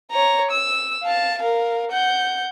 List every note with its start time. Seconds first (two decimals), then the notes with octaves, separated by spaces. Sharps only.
0.11 C#5 A#5
0.51 E6
1.04 F5 A5
1.38 A#4 F5
1.91 F#5 G6